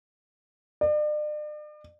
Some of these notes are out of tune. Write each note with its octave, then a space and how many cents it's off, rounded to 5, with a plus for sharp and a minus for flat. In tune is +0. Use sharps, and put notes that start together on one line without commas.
D5 +40